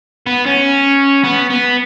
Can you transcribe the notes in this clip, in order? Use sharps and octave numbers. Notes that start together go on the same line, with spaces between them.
B3
C#4
B3
B3